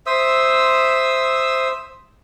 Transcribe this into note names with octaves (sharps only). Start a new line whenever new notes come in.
C5 E5 D#6 E6